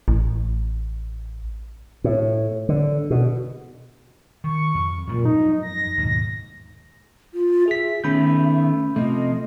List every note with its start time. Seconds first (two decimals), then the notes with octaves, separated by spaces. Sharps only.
0.08 A1
2.04 A2
2.69 D3
3.10 B2
4.44 D#3 C#6
4.74 F2
5.07 F#2 A#2 F3 G#3
5.25 D#4
5.62 A#6
5.98 D#2 G#2 B2
7.34 F4
7.68 G#4 E5 B6
8.04 D#3 A3 B3 C#4 B5 G6
8.96 C3 F3 A3 D#5